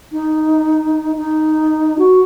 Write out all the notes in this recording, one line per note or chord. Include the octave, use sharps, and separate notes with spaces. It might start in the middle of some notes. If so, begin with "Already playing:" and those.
D#4
D#4
F#4